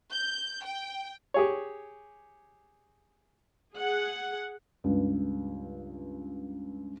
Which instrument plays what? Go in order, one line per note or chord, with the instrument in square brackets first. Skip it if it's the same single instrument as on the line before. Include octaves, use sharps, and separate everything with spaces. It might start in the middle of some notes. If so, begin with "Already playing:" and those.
[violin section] G6
G5
[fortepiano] G4 G#4 C#5
[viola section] G#4 F#5
[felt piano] C#2 G2